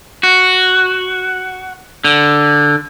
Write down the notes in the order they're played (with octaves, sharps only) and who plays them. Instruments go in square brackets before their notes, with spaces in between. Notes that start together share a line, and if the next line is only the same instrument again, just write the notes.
[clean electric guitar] F#4
D3